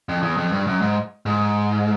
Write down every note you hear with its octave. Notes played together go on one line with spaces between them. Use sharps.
F2
E2
F2
G2
F#2
G#2
G#2